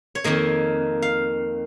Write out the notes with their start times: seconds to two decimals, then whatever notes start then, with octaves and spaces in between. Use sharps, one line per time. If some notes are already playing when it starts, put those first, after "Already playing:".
0.15 C#5
0.24 F2 D#3 A#3 D#5
1.02 F5